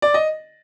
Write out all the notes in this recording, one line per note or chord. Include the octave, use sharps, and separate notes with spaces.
D5
D#5